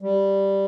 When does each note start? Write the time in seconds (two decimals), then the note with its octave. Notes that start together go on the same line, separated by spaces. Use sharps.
0.02 G3